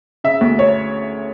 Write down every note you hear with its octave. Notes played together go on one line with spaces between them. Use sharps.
C#3 E5
D2
C#5